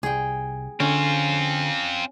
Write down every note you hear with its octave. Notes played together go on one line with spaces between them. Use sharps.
C2 G#4 G5
D3 C4 C#4 F4